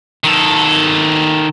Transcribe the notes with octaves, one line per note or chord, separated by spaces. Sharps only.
D#3 A4